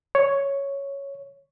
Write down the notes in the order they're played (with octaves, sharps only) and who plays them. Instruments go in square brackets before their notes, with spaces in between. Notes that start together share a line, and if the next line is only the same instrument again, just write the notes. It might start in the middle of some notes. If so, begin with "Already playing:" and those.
[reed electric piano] C#5